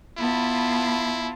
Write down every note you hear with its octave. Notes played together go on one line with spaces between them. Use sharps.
B3 E4 F4 A5